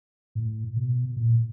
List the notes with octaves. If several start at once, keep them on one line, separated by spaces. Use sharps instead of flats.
A2
B2
A#2